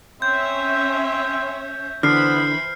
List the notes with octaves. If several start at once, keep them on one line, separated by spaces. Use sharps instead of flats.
C4 C#4 C#5 E5 G6
D3 E3 B3 C5 B5 F6 C7